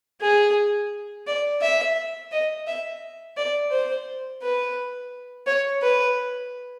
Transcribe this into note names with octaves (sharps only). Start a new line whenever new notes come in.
G#4
D5
E5
D#5
E5
D5
C5
B4
C#5
B4